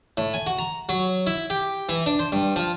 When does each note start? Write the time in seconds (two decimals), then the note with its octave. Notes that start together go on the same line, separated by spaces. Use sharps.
0.17 A2
0.34 G#5
0.47 F#4
0.58 A#5
0.89 F#3
1.27 E4
1.50 G4
1.89 E3
2.06 D4
2.19 C5
2.32 G2
2.56 F3